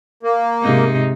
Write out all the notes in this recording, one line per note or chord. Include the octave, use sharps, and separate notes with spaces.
A#3
G#2 C3 D#4